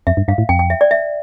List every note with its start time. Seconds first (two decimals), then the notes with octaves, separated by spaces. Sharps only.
0.07 F2 E5
0.17 G2
0.28 G2 F5
0.38 A2
0.49 F2 G5
0.59 G5
0.70 E5
0.81 D5
0.91 E5